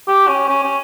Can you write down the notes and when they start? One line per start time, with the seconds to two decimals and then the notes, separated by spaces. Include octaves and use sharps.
0.08 G4
0.28 C#4
0.48 C#4
0.63 C#4